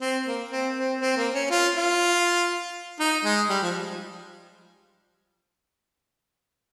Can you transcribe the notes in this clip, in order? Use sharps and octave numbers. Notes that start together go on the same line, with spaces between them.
C4
A#3
C4
C4
C4
A#3
C#4
F4
F4
D#4
G#3
G3
F3